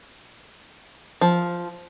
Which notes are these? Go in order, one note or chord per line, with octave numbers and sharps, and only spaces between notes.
F3